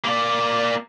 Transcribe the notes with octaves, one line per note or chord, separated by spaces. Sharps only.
A#3 D5